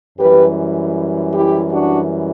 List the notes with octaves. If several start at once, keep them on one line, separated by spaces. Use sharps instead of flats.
F#2 E3 G3 G4 B4
E4 G4
D4 F#4